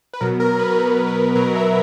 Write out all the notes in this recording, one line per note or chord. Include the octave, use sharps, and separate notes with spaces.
B4
B2 F#3 B3 A#4
A#4
B4
B2 F#3 B3 A#4
B4
B2 F#3 B3 A#4
E5